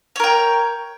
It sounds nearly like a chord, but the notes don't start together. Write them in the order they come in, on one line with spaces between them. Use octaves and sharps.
C#5 A#4 G5